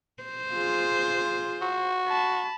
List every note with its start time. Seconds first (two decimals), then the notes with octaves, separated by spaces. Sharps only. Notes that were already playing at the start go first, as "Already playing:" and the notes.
0.24 C5
0.53 F4 G#4
1.62 F#4
2.09 A5 B5